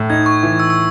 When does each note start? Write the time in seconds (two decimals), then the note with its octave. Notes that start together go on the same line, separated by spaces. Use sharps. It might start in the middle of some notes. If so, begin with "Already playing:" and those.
Already playing: A2
0.10 D#4 G#6
0.26 C#6
0.43 E3
0.59 E6
0.70 E6